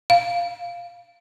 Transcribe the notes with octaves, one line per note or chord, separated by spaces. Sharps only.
F5